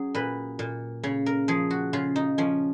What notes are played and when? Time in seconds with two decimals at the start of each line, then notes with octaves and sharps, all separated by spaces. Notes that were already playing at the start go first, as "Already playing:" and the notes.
Already playing: F#3 C#4 G#4
0.15 A#2 B4
0.59 A#2
1.03 C#3 C#5
1.26 A#4
1.48 F3 G#4
1.70 F#4
1.93 C#3 F4
2.16 D#4
2.38 F3 C#4